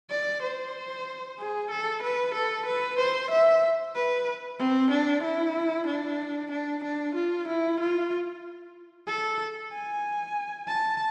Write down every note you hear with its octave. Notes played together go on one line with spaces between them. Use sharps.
D5
C5
G#4
A4
B4
A4
B4
C5
E5
B4
C4
D4
E4
D4
D4
D4
F4
E4
F4
A4
G#5
A5